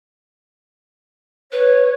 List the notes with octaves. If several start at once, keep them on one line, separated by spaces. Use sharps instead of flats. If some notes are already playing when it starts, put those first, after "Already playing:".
B4 C#5